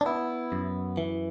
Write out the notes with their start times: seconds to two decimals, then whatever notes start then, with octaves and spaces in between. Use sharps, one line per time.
0.01 D4
0.06 B3 E4
0.52 F#2
0.97 E3